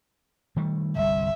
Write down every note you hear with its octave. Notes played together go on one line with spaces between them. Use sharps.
D#3 G3 A3
G1 C2 G3 E5